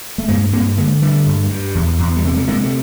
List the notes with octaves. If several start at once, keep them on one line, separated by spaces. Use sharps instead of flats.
A3
G2 G#3 A#3
G2 A#3 C4
D3 G#3 A#3
D3 G3 A3
G2
G2
E2
E2
G3
C3 G#3
A3
C3 G#3 A#3
A3